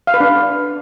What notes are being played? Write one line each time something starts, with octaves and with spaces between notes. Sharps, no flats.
F5
B4
D4